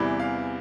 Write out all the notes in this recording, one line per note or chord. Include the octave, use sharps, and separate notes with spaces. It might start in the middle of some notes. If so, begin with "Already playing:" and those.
Already playing: E2 C3 E3 G3 B5
F5